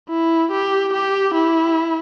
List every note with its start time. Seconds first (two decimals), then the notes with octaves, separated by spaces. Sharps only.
0.09 E4
0.52 G4
0.93 G4
1.34 E4